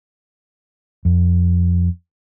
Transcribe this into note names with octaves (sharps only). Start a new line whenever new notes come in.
F2